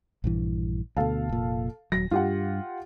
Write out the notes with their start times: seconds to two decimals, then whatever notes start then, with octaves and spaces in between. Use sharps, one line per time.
0.24 A#1 G2 E3
0.97 D2 B2 A4 F5 A5
1.29 F1 A#2
1.92 D#1 F#3 A#6
2.11 G2 F4 G4 F#5